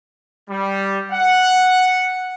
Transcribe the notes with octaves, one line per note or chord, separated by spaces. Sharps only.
G3
F#5